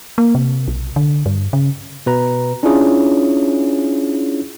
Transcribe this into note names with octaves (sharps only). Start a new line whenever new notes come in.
A#3
C3
B1
D3
G2
C#3
B2 B4 A#5
C#4 D4 E4 F4 G#4 C#5